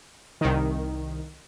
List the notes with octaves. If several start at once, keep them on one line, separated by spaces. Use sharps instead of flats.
C2 D#3